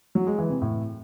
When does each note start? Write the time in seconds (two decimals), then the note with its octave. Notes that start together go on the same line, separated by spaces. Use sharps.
0.15 F#3
0.27 G#3
0.38 E3
0.50 C3
0.62 A2